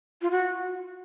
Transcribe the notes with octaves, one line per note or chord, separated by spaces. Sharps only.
F4
F#4